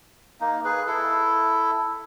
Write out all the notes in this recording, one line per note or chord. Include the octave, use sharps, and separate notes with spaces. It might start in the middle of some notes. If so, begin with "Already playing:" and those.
A#3 D#4
G#4 B4
E4 A4